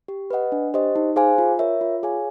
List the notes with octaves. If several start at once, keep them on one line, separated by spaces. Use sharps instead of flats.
G4
B4 D#5 F#5
D4
G4 C5 D#5
D#4
G#4 C5 F5 G#5
F4
A#4 C#5 E5
F4
G#4 C#5 F5 G#5